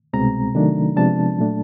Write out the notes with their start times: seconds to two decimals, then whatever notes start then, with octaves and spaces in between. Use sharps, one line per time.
0.13 C2 B2 G#3 C4 A#5
0.55 C3 D#3 F#3 A3 D4
0.96 C3 F3 G#3 B3 D4 A5
1.38 A#2 F#3 A3 D4